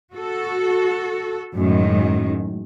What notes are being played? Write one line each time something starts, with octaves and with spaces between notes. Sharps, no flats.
F#4 A4
F#2 A2 D#3 G#3